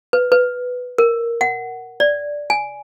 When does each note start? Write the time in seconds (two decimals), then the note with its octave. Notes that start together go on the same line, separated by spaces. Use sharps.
0.13 B4
0.32 B4
0.98 A#4
1.41 F#5
2.00 D5
2.50 G#5